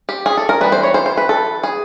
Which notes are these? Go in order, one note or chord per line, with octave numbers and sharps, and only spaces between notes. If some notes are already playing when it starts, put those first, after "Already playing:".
G4
G#4
A4
A#4
E3 G3 B3 B4
C5
C#5
C5
C5
B4
A4
G#4